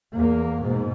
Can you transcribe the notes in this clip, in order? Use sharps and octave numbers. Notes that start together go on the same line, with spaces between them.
E2 A#3
G#2 B2